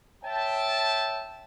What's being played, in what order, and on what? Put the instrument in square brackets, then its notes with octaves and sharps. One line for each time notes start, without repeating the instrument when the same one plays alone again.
[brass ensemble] C#5 E5 G5 A5